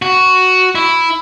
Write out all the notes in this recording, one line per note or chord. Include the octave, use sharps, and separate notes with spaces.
F#4
E4